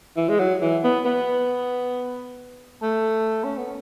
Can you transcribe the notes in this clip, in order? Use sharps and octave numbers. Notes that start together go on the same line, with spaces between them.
E3
G#3
F#3
E3
B3
B3
A3
C#4
B3